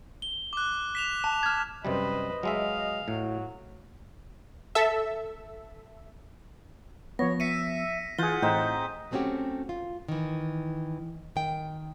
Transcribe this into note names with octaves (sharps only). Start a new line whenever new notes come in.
G7
D6 F#6
B6 E7 F7
A5
F6 G#6
F#2 C3 G3 B4 C5 D#5
F#3 G#3 E5 F5
A2 F#3
A4 E5
F3 B3 C#5 A#6
E5 B6 C#7 D#7
E3 F4 G#4 F#5 G6 G7
A2 C4 D#4 E5
F#3 A3 C4 C#4 F#4 G4
F4
D#3 E3
D#3 G5